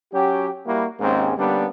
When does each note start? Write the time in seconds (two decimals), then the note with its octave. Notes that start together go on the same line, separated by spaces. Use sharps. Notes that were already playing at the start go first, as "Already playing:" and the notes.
0.14 F#3 C#4 F#4 G4
0.67 G3 A#3 E4 F#4
1.00 D#2 G#2 G#3 A#3 C4 C#4
1.38 D3 G3 A#3 B3 C#4 D4